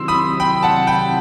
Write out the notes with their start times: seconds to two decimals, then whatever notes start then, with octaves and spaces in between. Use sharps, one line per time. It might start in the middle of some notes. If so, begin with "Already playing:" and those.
Already playing: C3 D#3 F#3 C4 E4 C6 E6
0.08 B5 D#6
0.40 G5 B5
0.63 F#5 A5
0.87 G5 B5